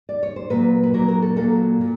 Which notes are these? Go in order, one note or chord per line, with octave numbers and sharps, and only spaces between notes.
D5
C#5
C5
A#2 F#3 A#3 B4
B4
A#2 F#3 A#3 A#4
A#4
A4
A#2 F#3 A#3 A4
A#2